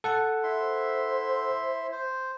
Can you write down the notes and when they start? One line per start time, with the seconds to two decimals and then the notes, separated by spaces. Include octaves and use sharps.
0.04 A4 F#5 A5
0.43 E4 E5 C6
0.60 C5
1.92 C5